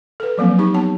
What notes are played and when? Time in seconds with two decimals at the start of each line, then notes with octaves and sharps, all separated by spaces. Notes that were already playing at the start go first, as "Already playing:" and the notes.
0.20 A4 B4
0.38 F3 F#3 A#3 C4
0.59 D#4 G4 C#6
0.74 B3 C#5 A5